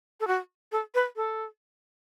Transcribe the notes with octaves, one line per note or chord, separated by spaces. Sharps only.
A4
F#4
A4
B4
A4